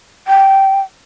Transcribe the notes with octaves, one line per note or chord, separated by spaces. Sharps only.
G5